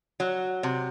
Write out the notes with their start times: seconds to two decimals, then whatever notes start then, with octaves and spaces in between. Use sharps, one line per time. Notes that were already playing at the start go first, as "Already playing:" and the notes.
0.20 F#3
0.63 C3